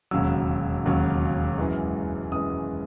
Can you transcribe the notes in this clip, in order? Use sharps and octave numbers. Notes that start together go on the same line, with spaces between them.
E1 D#2 C#3 F#3 E6
E1 D#2 C#3 F#3
F#2 E3 G#3
F#2 E3 G#3 D#6